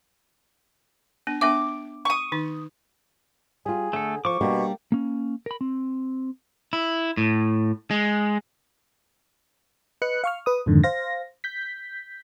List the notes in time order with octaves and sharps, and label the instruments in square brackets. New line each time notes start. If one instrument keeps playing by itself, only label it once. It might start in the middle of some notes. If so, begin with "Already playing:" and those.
[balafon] B3 D4
[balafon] B3 D4 E5 [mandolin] D6
[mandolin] C#6 D#6
[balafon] D#3 D#4
[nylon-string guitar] G3 F4 [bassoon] G#4
[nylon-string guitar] D3 [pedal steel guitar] A3 A4
[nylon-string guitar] F3 [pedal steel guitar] C#6 D6
[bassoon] B2 [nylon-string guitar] G3 A#3 D4
[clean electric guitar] A#3 C#4
A#4 B5
C4
E4
A2
G#3
[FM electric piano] B4 D#5 F#6 C#7
F5 C#6 F6
B4 D#6
F2 G#2 D3 D#3
C5 F5 A#6
G6 B6